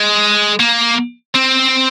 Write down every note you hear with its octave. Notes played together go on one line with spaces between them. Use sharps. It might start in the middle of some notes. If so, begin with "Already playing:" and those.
Already playing: G#3
A#3
C4